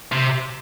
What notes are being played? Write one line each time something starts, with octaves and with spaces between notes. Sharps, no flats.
C3